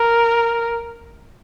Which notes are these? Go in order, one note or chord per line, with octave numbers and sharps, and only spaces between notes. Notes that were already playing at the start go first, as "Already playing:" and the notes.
Already playing: A#4